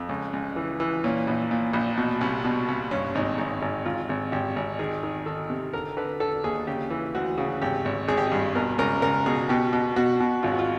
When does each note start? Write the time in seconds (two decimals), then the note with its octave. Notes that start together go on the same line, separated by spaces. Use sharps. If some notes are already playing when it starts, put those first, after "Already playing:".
Already playing: F2
0.09 C#2
0.33 C#2
0.56 E3
0.80 E3
1.04 A#2 C#4
1.27 A#1
1.51 A#2
1.73 A#1
1.98 B2
2.21 C2
2.44 B2
2.68 C2
2.91 G2 C#4
3.15 G#1 D#4
3.38 G#1 D#4
3.62 G#1
3.85 G#1 F4
4.09 G#1
4.32 G#1 G4
4.56 G#1
4.79 D#3 G#4
5.03 D#3
5.26 D#3 A4
5.50 C3
5.73 D3 A#4
5.97 D3 B4
6.20 D3 A4
6.44 D#2 G#4
6.67 C#3 G4
6.90 E3
7.15 D2 F#4
7.38 C#3
7.62 G#1 G4
7.85 G#1
8.08 G#1 G#4
8.17 G4
8.27 G#4
8.32 G2
8.55 B2 A#4
8.78 C#2 A#4
9.02 C#2 A#4
9.26 B2 G#4
9.49 B2 G4
9.73 B2
9.96 B2 F#4
10.20 B2
10.43 G#1 F4
10.52 F#4
10.59 F4